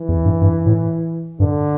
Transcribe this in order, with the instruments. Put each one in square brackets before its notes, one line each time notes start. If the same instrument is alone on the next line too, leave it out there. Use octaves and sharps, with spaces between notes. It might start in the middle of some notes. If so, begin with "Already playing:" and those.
Already playing: [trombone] E3
[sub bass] E2
G2
G2
A2
[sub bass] G2 [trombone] D3